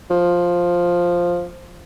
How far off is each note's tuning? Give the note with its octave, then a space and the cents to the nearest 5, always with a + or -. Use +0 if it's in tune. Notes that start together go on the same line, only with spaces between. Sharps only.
F3 +5